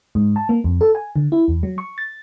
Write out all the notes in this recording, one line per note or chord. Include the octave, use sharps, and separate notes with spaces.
G#2
A5
A#3
F2
A4
G#5
D3
E4
E2
F#3
C#6
A6